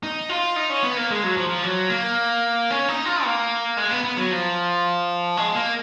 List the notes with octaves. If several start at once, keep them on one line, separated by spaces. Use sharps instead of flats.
D#4
F4
D#4
C#4
B3
A#3
G#3
F#3
F3
F3
F#3
A#3
C#4
D#4
F4
A#3
G#3
B3
B3
F#3
F3
G#3
A#3